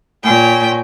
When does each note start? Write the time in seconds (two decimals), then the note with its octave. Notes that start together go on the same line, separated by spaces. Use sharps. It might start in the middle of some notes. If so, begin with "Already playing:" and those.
0.24 A#2 C#5 G5 G#5